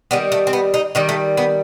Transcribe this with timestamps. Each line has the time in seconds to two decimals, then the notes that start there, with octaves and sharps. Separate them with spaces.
0.11 D#3 G3 B3
0.32 A3
0.47 C4
0.53 B3
0.74 D#4
0.95 D#3 G3 D#4
1.09 A3
1.37 B3